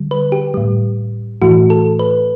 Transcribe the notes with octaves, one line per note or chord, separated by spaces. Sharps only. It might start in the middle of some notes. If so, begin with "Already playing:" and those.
Already playing: D3 G3
B4
G4
A2 G3
A2 E3 A3 F#4
A4
B4